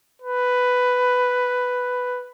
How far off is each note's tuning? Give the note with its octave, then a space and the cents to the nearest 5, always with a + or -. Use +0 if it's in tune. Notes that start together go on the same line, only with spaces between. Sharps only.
B4 +5